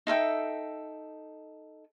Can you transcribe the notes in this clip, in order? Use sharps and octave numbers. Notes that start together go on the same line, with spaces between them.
D#4 A4 E5 G5